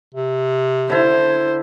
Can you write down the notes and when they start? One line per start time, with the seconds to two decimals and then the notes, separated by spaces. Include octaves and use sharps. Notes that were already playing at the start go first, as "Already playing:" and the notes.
0.14 C3
0.90 D3 E4 C5